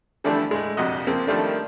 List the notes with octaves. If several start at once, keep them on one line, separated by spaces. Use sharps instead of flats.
D3 E3 F3 G3 A3 D4
A2 G#3
A#1 F2 C3 F#4 D#5
C#3 F3 A#3 C4
D#3 F3 G3 A3 D4